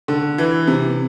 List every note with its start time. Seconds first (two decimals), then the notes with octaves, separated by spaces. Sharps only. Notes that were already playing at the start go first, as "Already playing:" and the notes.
0.08 D3
0.38 E3
0.67 C3